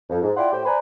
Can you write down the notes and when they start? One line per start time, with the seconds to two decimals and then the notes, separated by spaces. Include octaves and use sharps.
0.10 F2
0.22 G#2
0.37 E4 F4 D5 F#5 G5 C6
0.52 A2 G4 C5 G5
0.65 B4 C5 D5 G#5 A#5 B5